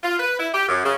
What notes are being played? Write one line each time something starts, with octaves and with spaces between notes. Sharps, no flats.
F4
B4
E4
G4
F#2
C#3